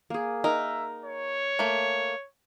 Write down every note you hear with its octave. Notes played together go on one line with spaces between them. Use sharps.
A#3 G#4
D#4 A#4 E5
C#5
A3 A#3